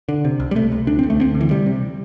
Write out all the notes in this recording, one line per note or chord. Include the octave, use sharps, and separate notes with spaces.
D3
C3
C2
G3
C3 A3
C2
D2 D4
D2 C4
A3
D2 C4
D3
E3
C3 G3
C3